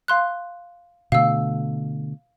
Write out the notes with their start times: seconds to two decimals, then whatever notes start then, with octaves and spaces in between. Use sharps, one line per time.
0.08 F5 C6 F#6
1.12 B2 D3 A3 F5 E6